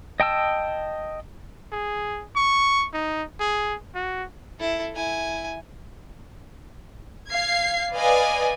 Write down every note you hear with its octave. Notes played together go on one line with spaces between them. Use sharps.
D#5 G5 A5 E6
G#4
C#6
D#4
G#4
F#4
E4 A4
E4 G#5
F5 G#6 C7
B4 D5 D#5 F5 G#5